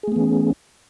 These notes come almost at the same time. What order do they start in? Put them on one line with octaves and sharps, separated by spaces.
G#4 A3 B3 E3 C#4